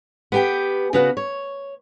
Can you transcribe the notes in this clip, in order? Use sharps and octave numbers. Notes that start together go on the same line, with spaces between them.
B3 G4 G5
C#3 B3 F#4
C#5